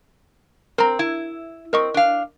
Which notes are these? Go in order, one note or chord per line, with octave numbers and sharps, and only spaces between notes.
C4 A#4 A#5
E4
C4 A#4 D#5 C#6
D4 F5